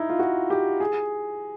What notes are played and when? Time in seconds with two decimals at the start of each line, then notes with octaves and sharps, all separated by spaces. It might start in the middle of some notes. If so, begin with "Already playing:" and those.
Already playing: D#4 E4
0.09 F4
0.19 F#4
0.50 G4
0.80 G#4